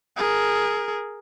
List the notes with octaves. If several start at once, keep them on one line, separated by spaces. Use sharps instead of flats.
G#4 A#4